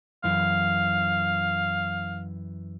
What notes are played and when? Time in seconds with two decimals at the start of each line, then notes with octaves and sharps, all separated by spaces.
0.24 F#2 E3 F5